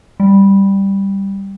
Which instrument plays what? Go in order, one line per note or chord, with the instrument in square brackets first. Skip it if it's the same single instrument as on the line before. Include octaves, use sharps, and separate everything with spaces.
[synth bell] G3